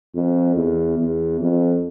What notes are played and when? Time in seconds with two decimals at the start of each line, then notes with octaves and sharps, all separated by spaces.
0.15 F2
0.56 E2
0.98 E2
1.40 F2